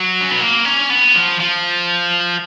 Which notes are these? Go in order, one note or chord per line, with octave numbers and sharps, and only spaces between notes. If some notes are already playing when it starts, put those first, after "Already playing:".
Already playing: F#3
C#4
B3
A#3
C#4
B3
F3
F3